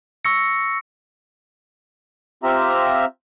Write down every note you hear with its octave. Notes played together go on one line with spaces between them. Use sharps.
C#6 E6 A#6 C#7
C4 F4 G4 E5 A#5